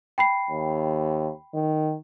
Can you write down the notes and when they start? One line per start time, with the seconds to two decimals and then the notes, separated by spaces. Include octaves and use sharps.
0.18 G5 B5 C7
0.50 D#2
1.54 D#3